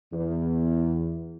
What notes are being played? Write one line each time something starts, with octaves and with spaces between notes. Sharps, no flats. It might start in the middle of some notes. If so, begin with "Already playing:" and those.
E2